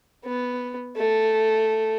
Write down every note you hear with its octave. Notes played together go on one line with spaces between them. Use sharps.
B3
A3